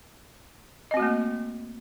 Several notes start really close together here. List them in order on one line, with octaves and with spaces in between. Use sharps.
D#5 C4 F#4 A3 A#3